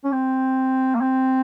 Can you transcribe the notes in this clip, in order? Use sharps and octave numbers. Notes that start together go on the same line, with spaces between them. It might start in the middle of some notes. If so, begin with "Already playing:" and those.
C#4
C4
A#3
C4